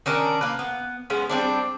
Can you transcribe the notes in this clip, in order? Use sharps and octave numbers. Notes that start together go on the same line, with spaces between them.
D#3 C#4 D4 A#4
A#3 B4
B3
G#3 B3 C#4
G3 A#3 C4 D4